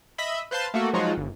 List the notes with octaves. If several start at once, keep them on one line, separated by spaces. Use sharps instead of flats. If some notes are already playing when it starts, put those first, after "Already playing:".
D#5 E5 B5
B4 C5 F5 A5 C6
A3 A#3 F#4 A4
F3 F#3 G#3 D#4 F4 F#4
G1